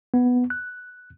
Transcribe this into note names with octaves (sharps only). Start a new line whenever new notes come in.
B3
F#6